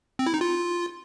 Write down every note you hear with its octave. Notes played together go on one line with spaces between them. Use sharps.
C4
E4
D#4
F4